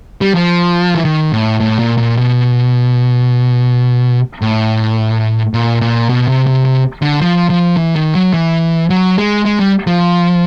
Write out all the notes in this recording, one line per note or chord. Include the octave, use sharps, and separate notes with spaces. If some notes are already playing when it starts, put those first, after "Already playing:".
G3
F3
E3
D#3
A2
A2
A#2
A#2
B2
A2
A#2
A#2
B2
C3
C3
C3
D3
F3
F3
E3
D#3
F#3
E3
F#3
G#3
G#3
G3
F3